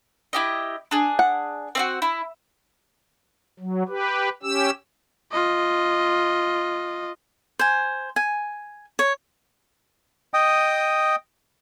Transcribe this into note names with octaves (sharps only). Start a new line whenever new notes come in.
E4 G4 D#5
D4 G#4
F#5
C4 E4 F#4
E4
F#3
G4 B4
C#4 G4 E6
F4 D#5
C5 G#5
G#5
C#5
D#5 G5 D#6